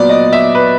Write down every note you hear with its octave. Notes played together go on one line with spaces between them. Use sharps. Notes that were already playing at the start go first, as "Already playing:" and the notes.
Already playing: A#2 F#3 B3 D5
D#5
E5
B4